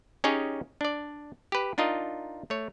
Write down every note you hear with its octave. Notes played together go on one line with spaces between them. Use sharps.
C#4 D#4 G4 G#4 C#5 D#5
D4 D5
G4 B4
D4 D#4 F4 A#4 D#5
A3 C#5